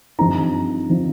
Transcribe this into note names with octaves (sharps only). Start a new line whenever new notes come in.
G2 F3 C4 D#4 A#5
F3 C4 D#4